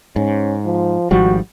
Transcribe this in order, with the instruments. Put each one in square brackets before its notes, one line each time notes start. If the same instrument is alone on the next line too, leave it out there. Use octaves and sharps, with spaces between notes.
[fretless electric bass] G#2 [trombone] C#4
[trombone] F3
[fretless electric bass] G#1 F3 G3 [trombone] F#4